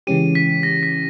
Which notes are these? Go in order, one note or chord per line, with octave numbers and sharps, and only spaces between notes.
C#3 E3 G#3 C#4 G4 D#7
B6
A#6
B6